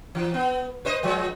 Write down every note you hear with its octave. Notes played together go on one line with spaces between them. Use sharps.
E3
B3
B4 C5 D#5
F3 G#3